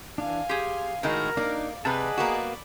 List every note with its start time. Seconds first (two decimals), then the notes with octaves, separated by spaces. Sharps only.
0.18 E3 D4 F5 G#5
0.49 G4 G#4 C6
1.03 A2 D#3 G#3 F#4 A#4 A#5
1.37 A#3 D4 D#4 D5 F5
1.85 C3 G#4 B4 D5 D#5 F#5 A5 B5
2.17 A#3 B3 F#4